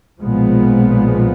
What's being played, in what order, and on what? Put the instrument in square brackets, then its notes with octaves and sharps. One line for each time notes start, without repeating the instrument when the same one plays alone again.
[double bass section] B1 A#2 F3 G#3 B3